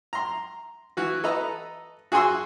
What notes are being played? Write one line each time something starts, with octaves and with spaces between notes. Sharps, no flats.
A#5 C6
E3 F#4
A4 B4 D#5 A#5
F#4 G#4 G#5 C6 E6